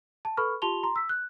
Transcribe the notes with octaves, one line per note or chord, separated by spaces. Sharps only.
A5
A4 B4 B5 C#6 F6
F4 G4 A5 C6 F7 G7
A#5 C6
E6 B6
F#6